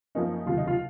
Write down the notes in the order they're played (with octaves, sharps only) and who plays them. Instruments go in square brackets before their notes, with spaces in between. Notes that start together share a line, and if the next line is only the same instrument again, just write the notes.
[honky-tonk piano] F#2 F3 A#3 C#4 D#4
F1 D#2 C#3 F#3 F4
D#4
F4